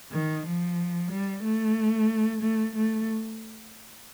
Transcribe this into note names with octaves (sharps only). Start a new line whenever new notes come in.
D#3
F3
G3
A3
A3
A3